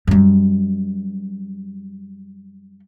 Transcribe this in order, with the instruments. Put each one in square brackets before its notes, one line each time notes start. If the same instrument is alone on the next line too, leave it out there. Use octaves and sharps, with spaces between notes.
[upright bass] F#2 G3